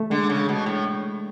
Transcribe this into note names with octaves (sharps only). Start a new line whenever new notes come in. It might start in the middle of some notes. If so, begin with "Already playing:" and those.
Already playing: A3
D3 G#3
C#3
B2
A2